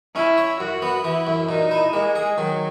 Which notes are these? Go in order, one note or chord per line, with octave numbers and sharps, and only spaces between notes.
C#4 E4
C#5
F#2 F#4
B3
E3 E4
F#2
A#2 D#4
E4
G#3 A#3
G#4
D#3 F#3